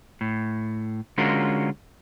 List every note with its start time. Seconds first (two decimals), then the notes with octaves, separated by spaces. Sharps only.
0.21 A2
1.18 D3 G#3 C#4 F4 F#4 A#4